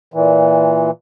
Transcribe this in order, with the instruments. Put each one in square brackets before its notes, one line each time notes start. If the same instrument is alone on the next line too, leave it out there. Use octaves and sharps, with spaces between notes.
[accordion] A#2 E3